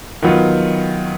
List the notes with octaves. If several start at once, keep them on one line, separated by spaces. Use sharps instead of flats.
D#3 F#3 B3 F4